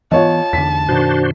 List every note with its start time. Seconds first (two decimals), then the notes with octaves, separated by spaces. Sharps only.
0.12 E3 B3 F4 C#5 D#5 A5
0.53 E2 D3 B6
0.89 F#2 B2 D#3 D4 F#4 C5